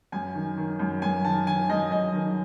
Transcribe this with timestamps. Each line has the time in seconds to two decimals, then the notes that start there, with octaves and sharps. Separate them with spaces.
0.12 F#2 G#5
0.35 D#3
0.57 D#3
0.80 F#2
1.02 F#2 G#5
1.25 D#3 A5
1.47 D#3 G#5
1.69 F#2 D#5
1.92 F#2 D#5
2.15 D#3